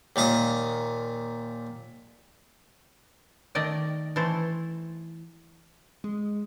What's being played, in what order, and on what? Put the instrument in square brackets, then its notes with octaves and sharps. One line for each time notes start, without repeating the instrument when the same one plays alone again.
[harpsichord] D#2 A#2 F5 A#5 D#6
[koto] D#3 A3 D5 D#5 G5
E3 A3 A4 C5
[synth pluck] G#3